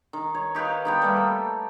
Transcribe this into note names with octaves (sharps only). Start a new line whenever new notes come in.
D#3
C#5
D#4 G4 B4 F5
D#3 B3 G5
G3 A3 A#3
A4